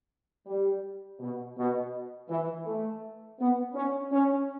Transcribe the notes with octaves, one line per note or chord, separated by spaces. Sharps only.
G3
B2
B2
E3
A3
B3
C#4
C#4